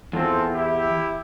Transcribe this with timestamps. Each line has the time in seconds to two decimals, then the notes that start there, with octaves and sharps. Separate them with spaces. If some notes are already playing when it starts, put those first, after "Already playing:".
0.13 E2 C4 F4 A4
0.53 E4 G4 E5